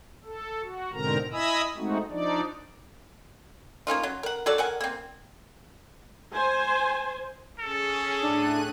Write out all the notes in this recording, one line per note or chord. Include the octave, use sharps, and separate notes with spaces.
A4
F#4
G#2 B2 D3 C4 A#4 A#5
E4 D#5 G#5 B5 D#6 E6
G#3 A3 C4 D#4 F#4
F3 D4 D#4 D5
A#3 C#4 D#4 F4
F#3
A#4 F#5
F#3 F#4 A4 D5
A#4 F#5 G#5
A#3 C4
C5 G#5
C#4 G#4 A4
A2 D4 F#6 D#7